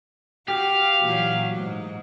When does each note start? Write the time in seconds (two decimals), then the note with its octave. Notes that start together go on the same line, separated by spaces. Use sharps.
0.48 F#4 G4 F5
1.00 A#2 E3 F#3
1.55 G#2